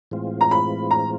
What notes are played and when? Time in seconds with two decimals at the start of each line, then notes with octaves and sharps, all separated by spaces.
0.11 A2 E3 G#3 C4 F4
0.41 A#5
0.51 B5
0.91 A#5